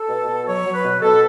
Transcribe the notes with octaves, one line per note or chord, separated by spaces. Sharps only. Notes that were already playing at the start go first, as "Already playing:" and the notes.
Already playing: A4
B2
B2
F#3 C#5
F#3
B4
B2
B2 A4